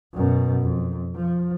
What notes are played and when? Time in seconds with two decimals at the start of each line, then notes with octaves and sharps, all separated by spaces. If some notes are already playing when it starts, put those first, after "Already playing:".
0.14 F#2 B2
0.62 F2
1.16 F3